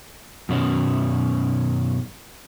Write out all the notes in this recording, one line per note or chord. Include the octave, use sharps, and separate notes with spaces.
F#2 B2 D#3 C#4